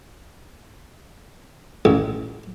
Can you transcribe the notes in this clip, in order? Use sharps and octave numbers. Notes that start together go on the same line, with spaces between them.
A1